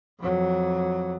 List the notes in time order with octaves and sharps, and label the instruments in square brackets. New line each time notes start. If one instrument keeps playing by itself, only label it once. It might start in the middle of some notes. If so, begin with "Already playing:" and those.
[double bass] F2 F#3